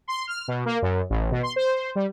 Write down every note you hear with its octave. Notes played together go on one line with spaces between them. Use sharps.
C6
F6
B2
A#3
F#2
A1
B2
C6
C5
G3